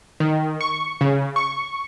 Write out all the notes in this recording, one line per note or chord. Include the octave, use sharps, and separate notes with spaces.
D#3
C#6
C#3
C#6